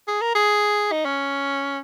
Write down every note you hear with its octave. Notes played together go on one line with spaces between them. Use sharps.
G#4
A#4
G#4
D#4
C#4